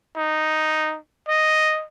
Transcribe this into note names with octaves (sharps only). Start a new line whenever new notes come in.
D#4
D#5